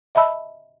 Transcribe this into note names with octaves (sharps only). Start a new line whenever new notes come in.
D#5 E5 A5 B5 E6